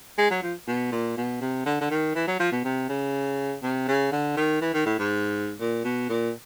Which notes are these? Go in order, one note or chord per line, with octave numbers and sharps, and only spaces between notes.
G#3
F#3
F3
B2
A#2
B2
C3
D3
D3
D#3
E3
F#3
F3
B2
C3
C#3
C3
C#3
D3
D#3
E3
D#3
A2
G#2
A#2
B2
A#2